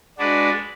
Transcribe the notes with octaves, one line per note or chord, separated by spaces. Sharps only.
G#3 D4 F#4 B4 D5